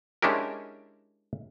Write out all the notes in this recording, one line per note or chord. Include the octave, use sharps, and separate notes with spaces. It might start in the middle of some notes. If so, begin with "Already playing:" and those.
G#3 C#4 D4 E4 G4 A#4